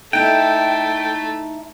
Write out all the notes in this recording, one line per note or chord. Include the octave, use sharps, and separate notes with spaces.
A3 D#4 E4 G5